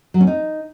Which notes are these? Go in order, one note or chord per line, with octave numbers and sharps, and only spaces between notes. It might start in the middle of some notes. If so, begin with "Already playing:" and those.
F#3
C#4
D#4